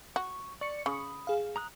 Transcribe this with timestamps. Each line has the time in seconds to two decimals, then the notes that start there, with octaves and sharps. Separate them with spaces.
0.16 F#4 C#6
0.61 D5 C#6 C#7
0.86 C#3 B5 D#6
1.27 G#4 F5
1.56 A#5 D#6 F#6